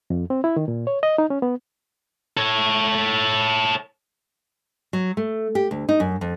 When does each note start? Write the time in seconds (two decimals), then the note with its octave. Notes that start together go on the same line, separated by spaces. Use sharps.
0.10 F2
0.30 C4
0.44 E4
0.56 D#3
0.68 A#2
0.87 C#5
1.03 D#5
1.18 D#4
1.30 C#4
1.42 B3
2.37 A4 C#5
4.93 F#3
5.17 A3
5.55 G4
5.71 D2
5.89 D#4
6.00 F#2
6.21 F2